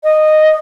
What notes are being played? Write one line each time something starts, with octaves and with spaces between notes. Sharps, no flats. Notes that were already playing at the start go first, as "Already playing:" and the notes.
D#5